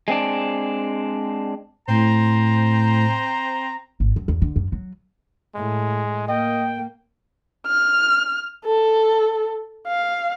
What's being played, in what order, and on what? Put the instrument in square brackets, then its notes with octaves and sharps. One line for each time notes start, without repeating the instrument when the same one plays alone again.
[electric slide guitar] G#3 C4 D4
[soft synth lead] A2 [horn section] C4 C5 A#5
[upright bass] G#1
F#2
E2
D3
F#2
F#3
[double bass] A2 [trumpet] G#3
[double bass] A#3 [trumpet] D#5 [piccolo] G5
[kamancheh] F6
A4
F5